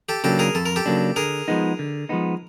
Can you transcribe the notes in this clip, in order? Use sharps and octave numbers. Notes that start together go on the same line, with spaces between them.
G4 A4
C#3 F#3 A#3 D4 G4 A4
G#4 A#4
F2 A4
A#4
G4 A4
C#3 F#3 A#3 D4
D3 G#4 A#4
F3 G#3 B3 D#4
D3
F3 G#3 B3 D#4